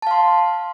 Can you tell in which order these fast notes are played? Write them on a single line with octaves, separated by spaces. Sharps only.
A5 F5 C6